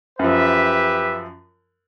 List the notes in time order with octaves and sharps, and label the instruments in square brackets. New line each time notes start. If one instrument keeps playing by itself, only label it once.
[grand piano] F#2 F3 [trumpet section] G4 B4 E5